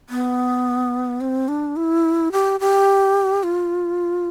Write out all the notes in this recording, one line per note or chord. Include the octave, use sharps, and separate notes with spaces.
B3
C4
D4
E4
G4
G4
F4